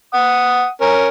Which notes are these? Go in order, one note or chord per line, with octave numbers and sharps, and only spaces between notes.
F#5 D#6
C#4 A#4